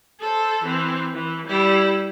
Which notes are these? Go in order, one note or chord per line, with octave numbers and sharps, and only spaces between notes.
A4 C5
E3 C4
E3
G3 E4